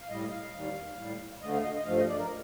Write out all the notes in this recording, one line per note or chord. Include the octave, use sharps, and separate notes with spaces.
F5
A2 G3 D#5
F5
D#2 D#3 G3
A2 G3
D2 D3 A3 D#5
F5
D#5
D#5
G2 F3 A3 F5
D#5
D5
A#4